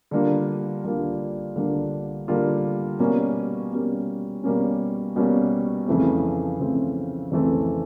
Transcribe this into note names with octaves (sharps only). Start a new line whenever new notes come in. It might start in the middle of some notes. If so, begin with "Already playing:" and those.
D3 G3 A#3 D4 F4
D3 G3 A#3 D4 F4
D3 G3 A#3 D4 F4
D3 G3 A#3 D4 F4
B2 G3 A#3 C#4
B2 G3 A#3 C#4
B2 G3 A#3 C#4
B2 G3 A#3 C#4
F2 C#3 E3 A3 C4
F2 C#3 E3 A3 C4
F2 C#3 E3 A3 C4